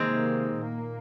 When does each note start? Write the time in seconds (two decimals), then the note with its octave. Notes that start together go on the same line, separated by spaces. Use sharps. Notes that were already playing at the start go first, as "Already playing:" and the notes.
Already playing: C3 D#3 G#3 A#3 C4
0.56 A#2 A#3